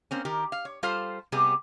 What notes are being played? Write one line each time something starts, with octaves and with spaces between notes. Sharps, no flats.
A#3 C4 C#4
D#3 G4 A#4
F5
C#5
G3 F4 A4 C5 F5
C3 G3 B3 G4 G#4